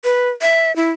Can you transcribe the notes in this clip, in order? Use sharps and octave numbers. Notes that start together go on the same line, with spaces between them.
B4
E5
E4